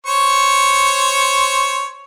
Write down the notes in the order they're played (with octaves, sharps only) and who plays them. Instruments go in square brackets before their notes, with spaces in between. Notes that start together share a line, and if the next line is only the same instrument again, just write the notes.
[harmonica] C5 C#5 C#6